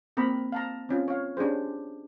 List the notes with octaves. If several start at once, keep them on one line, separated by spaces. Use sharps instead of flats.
A#3 C4 A#4 A#5 B5
F5 A5 A#5
C4 C#4 F4
C#5 F5
C#4 D4 G4 G#4 C5